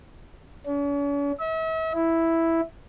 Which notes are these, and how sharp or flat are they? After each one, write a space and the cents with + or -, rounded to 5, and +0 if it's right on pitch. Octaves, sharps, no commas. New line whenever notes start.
C#4 +45
E5 -40
E4 +0